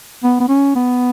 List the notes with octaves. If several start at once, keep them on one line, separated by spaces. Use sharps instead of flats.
B3
B3
C#4
B3